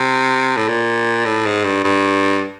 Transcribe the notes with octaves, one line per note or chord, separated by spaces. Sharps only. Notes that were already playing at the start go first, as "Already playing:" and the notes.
Already playing: C3
A2
A#2
A2
G#2
G2
G2